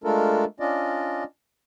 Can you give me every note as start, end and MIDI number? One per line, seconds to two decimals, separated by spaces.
0.04 0.45 56
0.04 0.45 57
0.04 0.45 62
0.04 0.45 65
0.04 0.45 69
0.04 0.45 70
0.60 1.24 61
0.60 1.24 62
0.60 1.24 65
0.60 1.24 74
0.60 1.24 75